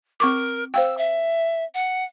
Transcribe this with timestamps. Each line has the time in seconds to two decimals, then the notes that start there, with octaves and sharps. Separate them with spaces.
0.20 C4 A#4 C#6 D6
0.74 C5 F5 G5 E6
0.98 E5
1.74 F#5